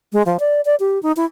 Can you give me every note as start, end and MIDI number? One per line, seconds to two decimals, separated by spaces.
0.13 0.22 56
0.26 0.37 53
0.40 0.61 74
0.65 0.75 74
0.80 1.01 67
1.03 1.12 63
1.17 1.25 64